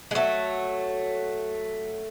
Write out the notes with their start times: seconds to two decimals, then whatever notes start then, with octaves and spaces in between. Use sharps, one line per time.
0.11 G#3
0.15 F#3 A3